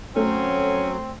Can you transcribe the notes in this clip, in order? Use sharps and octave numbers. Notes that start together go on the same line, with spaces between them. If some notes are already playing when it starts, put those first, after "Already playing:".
F#3 A3 C4 C#4